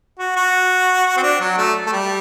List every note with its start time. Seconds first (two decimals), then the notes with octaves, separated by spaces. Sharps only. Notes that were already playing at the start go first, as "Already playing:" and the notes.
0.19 F#4
0.36 F#4
1.17 C4
1.23 D4
1.41 F#3
1.58 A3
1.87 A3
1.92 G3